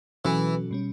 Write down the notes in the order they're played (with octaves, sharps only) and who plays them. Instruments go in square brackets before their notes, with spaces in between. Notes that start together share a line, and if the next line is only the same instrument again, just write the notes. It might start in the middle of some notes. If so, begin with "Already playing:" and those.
[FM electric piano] B2 F#3 C#4 F#4 A4 [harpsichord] E3
[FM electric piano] B2 G3 C#4